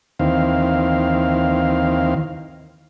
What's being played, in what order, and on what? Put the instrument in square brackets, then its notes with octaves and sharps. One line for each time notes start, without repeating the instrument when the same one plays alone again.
[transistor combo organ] D#2 D#3 E3 C4 F5